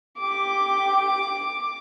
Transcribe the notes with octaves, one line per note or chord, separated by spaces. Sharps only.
G4 D6